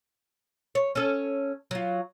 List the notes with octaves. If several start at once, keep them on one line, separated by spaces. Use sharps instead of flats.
C#5
C#4 A4
F#3 F4